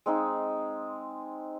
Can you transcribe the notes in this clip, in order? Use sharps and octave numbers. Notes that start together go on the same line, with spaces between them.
G#3 C4 D#4 F5